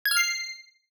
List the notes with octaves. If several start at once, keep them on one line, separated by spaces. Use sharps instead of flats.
G#6
F6
C7